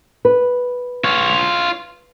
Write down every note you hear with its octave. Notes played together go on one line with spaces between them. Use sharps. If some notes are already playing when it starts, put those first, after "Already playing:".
B4
F4 C#5